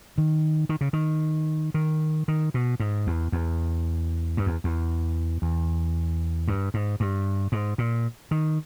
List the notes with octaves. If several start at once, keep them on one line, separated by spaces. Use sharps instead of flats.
D#3
D#3
C#3
D#3
D#3
D#3
B2
G#2
E2
E2
G2
E2
E2
E2
G2
G#2
G2
G#2
A#2
D#3